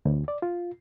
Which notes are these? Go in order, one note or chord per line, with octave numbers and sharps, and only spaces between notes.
D2
D5
F4